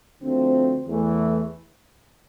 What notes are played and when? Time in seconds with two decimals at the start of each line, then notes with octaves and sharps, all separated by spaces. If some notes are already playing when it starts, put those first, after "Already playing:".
0.20 D2 D3 F3 A3 C4
0.87 E2 E3 A3